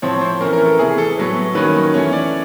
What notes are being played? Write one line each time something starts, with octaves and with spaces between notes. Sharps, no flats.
A2 F3 A3 C4 C#5
C5
E3 A3 C#4 A#4
A#4
A4
C3 E3 A3 G#4
A4
A2 F#3 B3
D#3 F#3 A#3 C#4 B4
E3 A3 C#4 C#5
D5